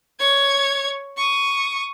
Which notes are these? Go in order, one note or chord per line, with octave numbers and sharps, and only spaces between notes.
C#5 G#6
C#6 D#6